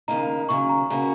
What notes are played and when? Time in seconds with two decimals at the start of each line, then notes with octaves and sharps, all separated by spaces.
0.08 D#2 C#3 A#3 D#4 A#5
0.49 D#2 C#3 F#3 C#6
0.69 A#5
0.90 C#3 A#3 F#4